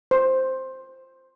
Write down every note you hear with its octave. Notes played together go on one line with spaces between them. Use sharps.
C5